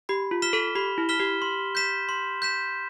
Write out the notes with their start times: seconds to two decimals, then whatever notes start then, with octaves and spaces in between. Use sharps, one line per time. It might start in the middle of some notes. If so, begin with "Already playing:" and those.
0.09 G4 B5
0.31 F4
0.42 F6 B6 E7 G7
0.53 A4
0.75 G4 B5
0.98 E4
1.09 F6 B6 E7 G7
1.20 G4
1.42 C6
1.75 G6 B6 E7
2.09 C6
2.42 G6 B6 E7